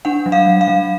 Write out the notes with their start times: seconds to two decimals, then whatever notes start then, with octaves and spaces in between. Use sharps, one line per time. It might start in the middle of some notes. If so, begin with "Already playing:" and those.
0.05 D4 F#5
0.26 F#3
0.32 F5
0.46 F#3
0.61 F5
0.67 F#3